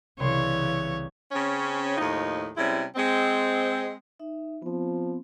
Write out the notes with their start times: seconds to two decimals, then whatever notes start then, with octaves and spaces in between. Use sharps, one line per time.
0.20 C2 C#3 E3 C#5 C6
1.32 C#3 C4 C#4
1.97 D#2 A2 F3 D#4
2.56 C3 G3 G#3 C#4 E4
2.96 G#3 C4
4.20 D#4 E5
4.62 F3 B3 C4